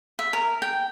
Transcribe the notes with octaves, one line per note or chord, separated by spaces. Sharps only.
E5
A#4
G5